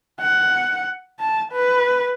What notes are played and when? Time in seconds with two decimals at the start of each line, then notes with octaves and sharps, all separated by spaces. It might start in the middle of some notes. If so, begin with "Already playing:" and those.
0.21 F#5
1.20 A5
1.52 B4